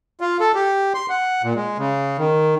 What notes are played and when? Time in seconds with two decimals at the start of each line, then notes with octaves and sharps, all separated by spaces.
0.21 F4
0.40 A4
0.55 G4
0.95 C6
1.10 F#5
1.43 A#2
1.55 G#3
1.78 C#3
2.18 D#3